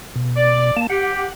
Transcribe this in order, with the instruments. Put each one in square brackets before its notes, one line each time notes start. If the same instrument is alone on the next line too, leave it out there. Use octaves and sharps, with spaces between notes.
[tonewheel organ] B2
[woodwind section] D5
[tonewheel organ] A#3 A5
[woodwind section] G4 [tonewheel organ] F#5